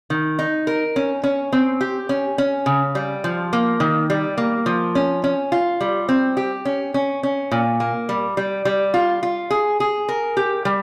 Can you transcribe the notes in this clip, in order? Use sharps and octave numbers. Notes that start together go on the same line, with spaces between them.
D#3
D#4
A#4
C#4
C#4
C4
G4
C#4
C#4
C#3
G3
F3
A#3
D#3
G3
A#3
F3
C#4
C#4
F4
G3
C4
G4
C#4
C#4
C#4
A#2
A#3
G3
G3
G3
F4
F4
G#4
G#4
A#4
G4
G3